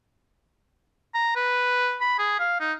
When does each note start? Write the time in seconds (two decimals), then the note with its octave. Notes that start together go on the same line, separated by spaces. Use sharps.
1.15 A#5
1.36 B4
2.01 B5
2.19 G#4
2.39 F5
2.60 D#4